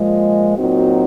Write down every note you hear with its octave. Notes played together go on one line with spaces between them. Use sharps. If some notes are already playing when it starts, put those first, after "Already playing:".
Already playing: A#2 F3 G#3
A#2 F#3 C4 D#4 F#4